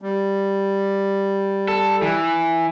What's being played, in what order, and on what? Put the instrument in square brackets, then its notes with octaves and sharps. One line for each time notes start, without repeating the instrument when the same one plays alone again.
[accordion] G3
[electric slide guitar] A4
E3